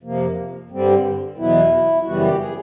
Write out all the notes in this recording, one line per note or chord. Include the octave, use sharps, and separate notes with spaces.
F2 C3 F3 A#3
G2 D3 G3 C4
E2 B2 F#3 B3 E4
F#2 C#3 E3 G3 B3 F#4
G4
G#4